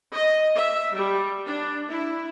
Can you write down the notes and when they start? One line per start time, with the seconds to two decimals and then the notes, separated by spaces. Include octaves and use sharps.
0.13 D#5
0.56 E5
0.96 G3
1.46 D4
1.90 E4